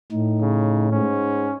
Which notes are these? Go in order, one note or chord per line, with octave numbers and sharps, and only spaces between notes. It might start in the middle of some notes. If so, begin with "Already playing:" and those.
A2 D#4
C#3
G#2 C#4